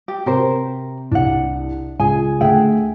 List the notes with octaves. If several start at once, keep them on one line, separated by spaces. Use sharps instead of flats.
G4
C3 G4 A#4 C5
C2 D4 F#5
C#2 G#4 G#5
D2 G#4 E5 F#5 G5